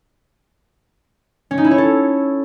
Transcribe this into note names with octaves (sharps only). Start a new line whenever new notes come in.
C#4
D#4
E4
C#5
A4